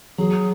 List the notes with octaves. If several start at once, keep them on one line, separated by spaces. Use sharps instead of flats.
F#3 G#4